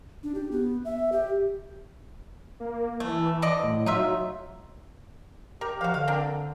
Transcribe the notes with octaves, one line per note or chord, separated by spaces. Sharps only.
D4
G4
B3
E5
G4
A#3
E3 A3
D3 D5 D#5
A2
F#3 D#4 F4 E5
G4 A#4 A#5
F3 F#4 F5
D3 F5
C4 D4 A#4